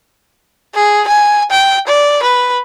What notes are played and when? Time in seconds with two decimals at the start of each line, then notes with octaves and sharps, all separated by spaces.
0.75 G#4
1.08 G#5
1.51 G5
1.87 D5
2.23 B4